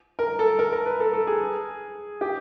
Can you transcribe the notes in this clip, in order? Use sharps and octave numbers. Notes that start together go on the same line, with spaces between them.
A#4
A4
A#4
A#4
B4
A4
A4
G#4
G4